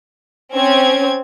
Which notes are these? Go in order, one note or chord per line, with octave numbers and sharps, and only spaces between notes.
C4 C#4 G#6